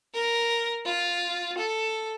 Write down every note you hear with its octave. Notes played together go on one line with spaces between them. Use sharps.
A#4
F4
A4